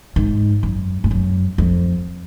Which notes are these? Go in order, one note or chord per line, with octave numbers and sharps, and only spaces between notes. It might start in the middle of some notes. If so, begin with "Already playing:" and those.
G#2
F#2
G#2
F#2
F2